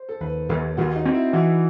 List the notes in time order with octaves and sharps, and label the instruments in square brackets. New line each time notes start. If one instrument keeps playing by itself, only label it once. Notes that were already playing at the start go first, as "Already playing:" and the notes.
Already playing: [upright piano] C5
A4
[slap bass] D#2 [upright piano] B4
[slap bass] D#2 [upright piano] A4
[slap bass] D#2 [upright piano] F#4
[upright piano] D#4
[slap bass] C4
[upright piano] E4
[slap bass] E3 [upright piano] F#4